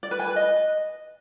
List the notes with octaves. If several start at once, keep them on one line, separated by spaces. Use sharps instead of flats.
D5
B4
G#5
B4
D#5